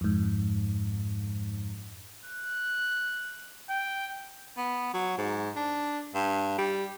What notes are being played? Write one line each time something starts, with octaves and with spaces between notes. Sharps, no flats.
F2 G#2
F#6
G5
B3
F#3
G#2
D4
G2
G3